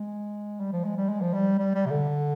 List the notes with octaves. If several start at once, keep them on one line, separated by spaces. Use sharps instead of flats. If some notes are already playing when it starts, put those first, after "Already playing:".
Already playing: G#3
G3
F3
G#3
G3
G#3
F3
G3
G3
G3
C3
D3